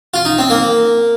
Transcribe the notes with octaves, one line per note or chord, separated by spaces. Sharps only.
F4
D#4
C4
A#3